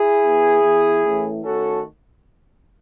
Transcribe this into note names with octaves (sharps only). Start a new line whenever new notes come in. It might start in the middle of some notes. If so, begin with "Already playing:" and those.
Already playing: E4 G#4
E3 B3
E3 B3
A2 E3 A3 C#4
D#3 A3 C#4 F#4 A4